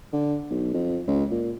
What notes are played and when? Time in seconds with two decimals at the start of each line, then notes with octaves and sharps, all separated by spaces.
0.13 D3
0.50 B1
0.74 F2
1.07 C#2
1.31 A#2